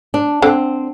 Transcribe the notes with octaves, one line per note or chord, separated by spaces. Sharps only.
D4
D3 C4